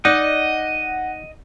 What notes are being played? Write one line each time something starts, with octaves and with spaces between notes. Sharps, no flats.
D#4 D5 D#5 F#5